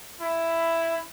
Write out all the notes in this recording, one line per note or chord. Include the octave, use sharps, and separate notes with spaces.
E4